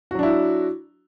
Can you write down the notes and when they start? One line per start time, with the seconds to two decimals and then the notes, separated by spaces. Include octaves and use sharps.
0.11 F#4
0.15 F#3
0.19 D4
0.23 E4